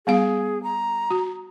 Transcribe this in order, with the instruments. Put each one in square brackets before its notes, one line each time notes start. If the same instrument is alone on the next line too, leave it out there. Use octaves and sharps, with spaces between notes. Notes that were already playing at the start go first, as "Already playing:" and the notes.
[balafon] G3 B3 F5 [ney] G#4
[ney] A#5
[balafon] F#4